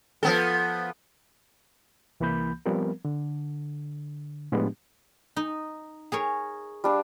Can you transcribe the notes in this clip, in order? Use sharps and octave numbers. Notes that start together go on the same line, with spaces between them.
F3 B3 A4
C2 E3 A#3 B5 G6
F3 G3 B3 C4 A#4
D3
A2 F3 G#3 B3 D4 G4
D#4
G#4 A#4 C#5
G3 D4 F5